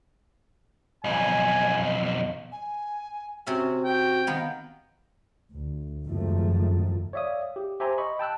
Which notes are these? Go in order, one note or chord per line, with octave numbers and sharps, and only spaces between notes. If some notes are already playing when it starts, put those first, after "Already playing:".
B1 F2 G#5
G#5
C3 C4 C#4 F#4
F#4 G5
D#3 B3 A#4 F5
D2
F#1 F2 G#2 D#3 F3 A3
C#5 D5 E5 F5 D#6
G4
G4 C5 E5 G#5 A#5 C6
D#5 B5 C#6
G5 A5 E6 F#6